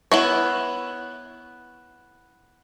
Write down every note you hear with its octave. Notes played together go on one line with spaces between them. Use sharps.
B3 E4 C#5